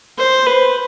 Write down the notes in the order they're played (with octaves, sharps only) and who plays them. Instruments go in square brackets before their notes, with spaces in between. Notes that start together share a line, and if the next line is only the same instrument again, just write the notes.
[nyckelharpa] C5
B4